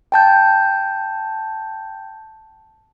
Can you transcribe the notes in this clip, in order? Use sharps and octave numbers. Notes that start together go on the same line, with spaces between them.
G5 A5 G6